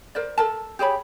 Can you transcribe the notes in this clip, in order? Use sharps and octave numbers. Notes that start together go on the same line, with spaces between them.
A#4 C5 D5
A4 A#4 A5
G4 G#4 C#5 B5